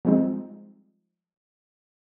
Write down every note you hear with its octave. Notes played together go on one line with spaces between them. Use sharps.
F3 G3 G#3 C4 D#4